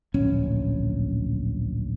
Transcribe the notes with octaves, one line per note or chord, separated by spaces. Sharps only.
D1 A#1 C#4